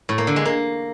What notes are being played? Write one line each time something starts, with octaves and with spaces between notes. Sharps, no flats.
A2
A#3
D3
G#3
A#3